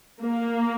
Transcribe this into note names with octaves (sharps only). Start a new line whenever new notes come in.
A#3